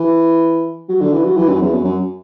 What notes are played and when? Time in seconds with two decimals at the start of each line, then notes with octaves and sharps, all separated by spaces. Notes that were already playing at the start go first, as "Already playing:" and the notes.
Already playing: E3
0.89 F#3
1.01 D3
1.13 E3
1.25 F#3
1.37 E3
1.49 F#2
1.61 E2
1.73 F#2
1.85 F#2